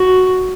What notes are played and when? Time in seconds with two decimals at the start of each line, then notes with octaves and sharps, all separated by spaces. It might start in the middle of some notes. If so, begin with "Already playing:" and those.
Already playing: F#4